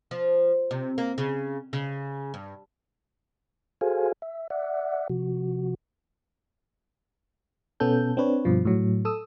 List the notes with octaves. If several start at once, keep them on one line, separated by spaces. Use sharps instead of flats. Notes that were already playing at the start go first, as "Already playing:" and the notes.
F3
C3
A#3
C#3
C#3
G2
F#4 G#4 A4 C5 F5 G#5
E5
D5 E5 F#5
C3 F3 F#4
B2 B3 C#4 A4 G6
C4 D4 B4 C#5
G2 B2 F3
A2 F#3
A4 D#6 E6